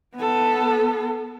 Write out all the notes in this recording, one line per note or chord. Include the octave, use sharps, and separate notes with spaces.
B3 A4